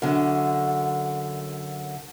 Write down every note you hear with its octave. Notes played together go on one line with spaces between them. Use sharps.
F#2 D3